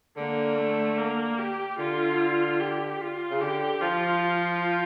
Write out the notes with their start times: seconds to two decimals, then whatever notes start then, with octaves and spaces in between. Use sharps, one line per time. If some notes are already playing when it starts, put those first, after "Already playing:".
0.17 D3 A#3
0.58 A3
0.98 A#3
1.38 G4
1.79 D3 F4
2.60 G4
3.01 F4
3.31 C#3
3.41 D3 G4
3.82 F3 F4
4.22 F4